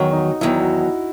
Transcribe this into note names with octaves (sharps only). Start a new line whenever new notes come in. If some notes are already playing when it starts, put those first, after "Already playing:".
Already playing: E2 D#3 F#3 F#4
D#4
E2 D#3 F#3 E4
F#4
F#4